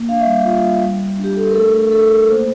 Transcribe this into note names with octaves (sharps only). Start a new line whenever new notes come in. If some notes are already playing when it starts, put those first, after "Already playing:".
Already playing: A#3
D4 F5
E5
G3
F4
G3
G3
G3
D4
G4
D4 A4
A#4
A3 A4
A3 A4
D4 A4
A3 A#4
A#3 C5